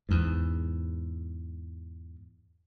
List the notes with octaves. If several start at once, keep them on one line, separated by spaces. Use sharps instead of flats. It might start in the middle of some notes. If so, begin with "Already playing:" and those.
E2 G#2